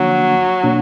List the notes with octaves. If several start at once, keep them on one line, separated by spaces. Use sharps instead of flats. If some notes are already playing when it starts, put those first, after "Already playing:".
Already playing: D3 F3 F#3 A#3 D4
B2 A#3 D4